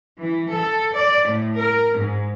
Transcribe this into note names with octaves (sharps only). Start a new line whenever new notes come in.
E3
A4
D5
A2
A#4
G#2